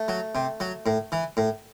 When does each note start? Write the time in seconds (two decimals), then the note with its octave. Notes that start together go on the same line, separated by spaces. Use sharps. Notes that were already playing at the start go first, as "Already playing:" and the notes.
Already playing: A3
0.08 F#3
0.35 C3
0.60 F#3
0.86 A2
1.12 E3
1.37 A2